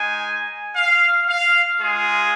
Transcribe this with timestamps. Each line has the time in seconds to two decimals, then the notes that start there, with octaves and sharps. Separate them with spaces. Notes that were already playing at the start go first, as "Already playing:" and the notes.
Already playing: G#3 D#4 G#5
0.76 F5
1.28 F5
1.80 G#3 F4 G#4